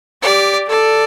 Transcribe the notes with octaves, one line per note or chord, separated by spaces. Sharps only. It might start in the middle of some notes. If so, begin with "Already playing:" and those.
G4 D5
A4 D5